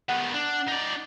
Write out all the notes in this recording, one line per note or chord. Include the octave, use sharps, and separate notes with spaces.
D#3 B3 F#5
D4
D#4 D5